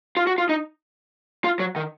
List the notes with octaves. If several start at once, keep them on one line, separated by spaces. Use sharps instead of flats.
F4
F#4
F4
D#4
F4
F#3
D#3